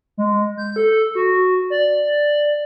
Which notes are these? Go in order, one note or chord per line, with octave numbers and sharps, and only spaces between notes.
G#3
G6
A4
F#4
D5